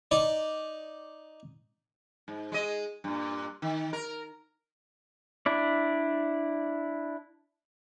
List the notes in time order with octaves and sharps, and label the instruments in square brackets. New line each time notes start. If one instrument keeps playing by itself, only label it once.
[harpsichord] D#4 D5
[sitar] G#2
G#3 D#5
G2 A#2
D#3
A#4
[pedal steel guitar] D4 E4 D5